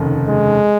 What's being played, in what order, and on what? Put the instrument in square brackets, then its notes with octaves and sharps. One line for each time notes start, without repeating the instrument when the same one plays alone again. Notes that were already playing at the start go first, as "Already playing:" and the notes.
Already playing: [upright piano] F1 D#2 C#3
[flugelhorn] G#3